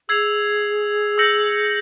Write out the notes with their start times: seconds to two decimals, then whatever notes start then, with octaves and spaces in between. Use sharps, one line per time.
0.09 G#4 E6 G#6 C7 F7
1.18 E6 G6 A#6 C#7 F#7